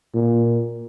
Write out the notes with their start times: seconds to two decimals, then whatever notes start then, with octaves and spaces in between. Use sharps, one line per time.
0.14 A#2